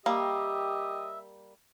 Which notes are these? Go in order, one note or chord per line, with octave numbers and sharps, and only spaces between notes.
G3 A#3 G4 D#5 E5